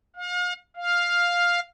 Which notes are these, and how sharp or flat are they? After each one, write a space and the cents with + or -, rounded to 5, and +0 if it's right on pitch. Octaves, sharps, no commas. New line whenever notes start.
F5 +40
F5 +5